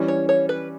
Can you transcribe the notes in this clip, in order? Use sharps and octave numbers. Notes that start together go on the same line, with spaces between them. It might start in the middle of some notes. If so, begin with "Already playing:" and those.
Already playing: E3 G3 C#4
C#5
C#5
B4